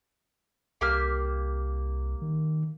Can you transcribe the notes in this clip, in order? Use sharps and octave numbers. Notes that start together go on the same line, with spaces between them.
C2 A#3 G4 F6
D#3